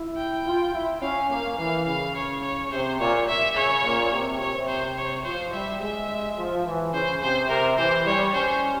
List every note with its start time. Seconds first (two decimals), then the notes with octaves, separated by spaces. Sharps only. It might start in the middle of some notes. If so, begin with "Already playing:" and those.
Already playing: E4
0.17 G5
0.46 F4
0.73 E4
1.02 C#4 F5
1.30 A#3 F5
1.58 E3 F5
1.87 C#3 F5
2.15 C#5
2.42 C#5
2.71 C3 C5
2.99 A#2 C#5
3.28 E5
3.55 C#3 C#5
3.84 A#2
4.12 C3
4.40 C3 C#5
4.68 C5
4.97 C#5
5.25 F3 C5
5.53 G3 E5
5.80 G#3 E5
6.38 F3
6.66 E3
6.93 C#3 C5
7.22 C3 C5
7.50 C3 A#4
7.78 E3 C5
8.06 G3 C#5
8.34 C#4 C5